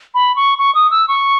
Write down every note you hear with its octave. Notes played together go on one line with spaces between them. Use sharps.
B5
C#6
C#6
D#6
E6
C#6